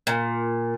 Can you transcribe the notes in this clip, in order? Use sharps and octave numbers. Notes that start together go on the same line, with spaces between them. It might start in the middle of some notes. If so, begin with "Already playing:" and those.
A#2